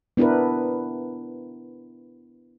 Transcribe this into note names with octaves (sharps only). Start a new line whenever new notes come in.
B3 D4 E4 A#4 B4